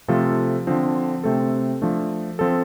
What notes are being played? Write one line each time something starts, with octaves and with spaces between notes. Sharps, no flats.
C3 F3 A3 F4 A4
D3 F3 C4
C3 A3 C4 A4
F3 A3 D4
F3 C4 A4